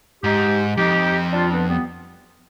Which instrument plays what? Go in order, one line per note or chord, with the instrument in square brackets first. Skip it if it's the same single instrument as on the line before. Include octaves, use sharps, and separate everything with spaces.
[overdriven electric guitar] G#2 [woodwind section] D#4 G4
[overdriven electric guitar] F2 [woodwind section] D#4 G4
[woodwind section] D4 F4
B3 D4
G3 B3